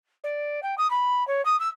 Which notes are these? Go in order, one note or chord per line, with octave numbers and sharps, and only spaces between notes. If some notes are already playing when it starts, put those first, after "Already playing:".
D5
G5
D#6
B5
C#5
D#6
E6